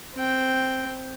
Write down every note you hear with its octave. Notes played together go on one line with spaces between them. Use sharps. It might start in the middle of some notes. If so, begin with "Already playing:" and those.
C4 G5